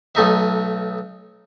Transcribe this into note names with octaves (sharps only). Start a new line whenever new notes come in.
B1 A3 D#4 E5